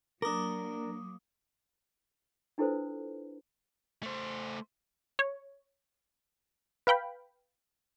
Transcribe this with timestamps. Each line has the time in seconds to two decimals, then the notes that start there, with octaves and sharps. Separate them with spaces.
0.22 F#3 A#3 D4 A#4 D6 D#6
2.58 D4 E4 F4 A4 B4 C5
4.03 A3 C5
5.19 C#5
6.87 B4 F5 G5 B5